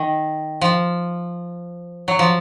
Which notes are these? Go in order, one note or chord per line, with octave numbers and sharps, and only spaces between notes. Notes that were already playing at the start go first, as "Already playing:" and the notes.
Already playing: D#3
F3
F#3
F3